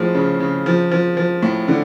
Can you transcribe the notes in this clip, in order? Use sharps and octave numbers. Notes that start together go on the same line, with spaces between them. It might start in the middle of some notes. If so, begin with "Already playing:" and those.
Already playing: A2 F3 G#3
C#3
C#3
F3
F3
F3
A2
D3